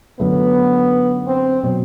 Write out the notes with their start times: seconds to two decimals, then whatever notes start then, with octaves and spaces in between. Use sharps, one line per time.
0.20 F#2 D3 F#3 A3 B3
1.27 C4
1.64 B2 F#3 C4